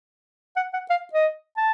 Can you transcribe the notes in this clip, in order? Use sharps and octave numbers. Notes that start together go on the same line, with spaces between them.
F#5
F#5
F5
D#5
A5